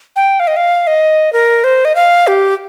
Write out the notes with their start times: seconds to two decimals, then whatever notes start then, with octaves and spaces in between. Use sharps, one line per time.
0.16 G5
0.40 F5
0.47 D#5
0.56 F5
0.87 D#5
1.33 A#4
1.64 C5
1.85 D#5
1.95 F5
2.27 G4